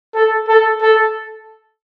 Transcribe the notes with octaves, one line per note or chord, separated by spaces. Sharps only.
A4
A4
A4